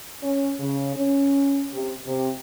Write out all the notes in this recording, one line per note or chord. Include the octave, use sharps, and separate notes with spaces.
C#4
C#3
C#4
C3
C3